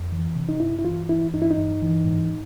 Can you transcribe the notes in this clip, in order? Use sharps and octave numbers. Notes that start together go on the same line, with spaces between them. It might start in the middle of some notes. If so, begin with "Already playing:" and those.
Already playing: F2
E3
C3
D#4
G2 E4
E4
E3 F4
E3 E4
G2 D#4
E4
D#4
G2
E3
G#2